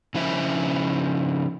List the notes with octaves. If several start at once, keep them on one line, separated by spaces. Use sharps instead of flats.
C#3 F3 E4 C5 E5